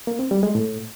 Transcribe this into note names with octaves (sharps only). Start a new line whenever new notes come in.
A#3
C4
G3
G#3
A2